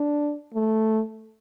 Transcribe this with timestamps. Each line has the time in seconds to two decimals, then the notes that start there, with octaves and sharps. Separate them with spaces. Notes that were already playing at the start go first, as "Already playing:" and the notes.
Already playing: D4
0.55 A3